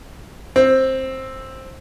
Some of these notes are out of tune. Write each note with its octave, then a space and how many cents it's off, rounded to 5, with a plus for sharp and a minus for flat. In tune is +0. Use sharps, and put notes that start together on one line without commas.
C4 +10